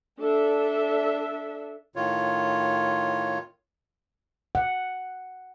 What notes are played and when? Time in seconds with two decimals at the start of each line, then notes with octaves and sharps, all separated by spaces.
0.19 D4 A4 E5
1.96 A2 D#3 F4 C#5
4.55 F#5